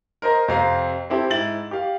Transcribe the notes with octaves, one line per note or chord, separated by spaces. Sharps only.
A#4 C5 D#5 A#5
F2 C3 C4 F5 A#5 C7
C4 E4 G4 A4
G#2 E4 A6 F#7
G4 F5